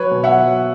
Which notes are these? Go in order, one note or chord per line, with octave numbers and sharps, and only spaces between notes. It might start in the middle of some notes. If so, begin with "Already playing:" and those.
Already playing: F#3 B4 C#5
B2
E5 F#5
F#3